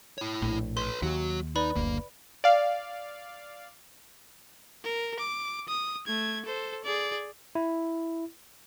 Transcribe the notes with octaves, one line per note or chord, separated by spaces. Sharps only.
E4 C#5
A#1 A2
B4 C#5 C6
D#2 F#3 F#4
D#4 B4 D5 B5
F#1 D2 A#3
D5 F5
A#4
D6
D#6
A3 G#6
A4 C5
G#4 D5
E4